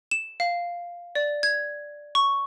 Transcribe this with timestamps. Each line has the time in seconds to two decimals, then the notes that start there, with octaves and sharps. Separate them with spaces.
0.11 E7
0.40 F5
1.15 D5
1.43 G#6
2.15 C#6